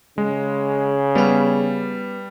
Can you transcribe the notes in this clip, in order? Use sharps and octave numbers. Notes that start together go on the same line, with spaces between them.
C#3 G#3
G3 B3 B4